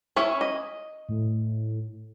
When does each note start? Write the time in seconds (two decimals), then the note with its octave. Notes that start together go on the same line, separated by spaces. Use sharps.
0.16 C#4 E4 C#5
0.41 D#5
1.09 A2